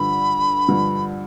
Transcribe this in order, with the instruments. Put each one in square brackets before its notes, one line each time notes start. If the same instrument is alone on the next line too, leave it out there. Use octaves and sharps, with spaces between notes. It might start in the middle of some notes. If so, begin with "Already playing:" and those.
Already playing: [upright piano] G2 D3 F3 [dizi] B5
[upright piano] G2 D3 F3